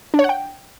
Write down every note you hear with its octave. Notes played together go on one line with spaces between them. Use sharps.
D4
C#5
F#5
G5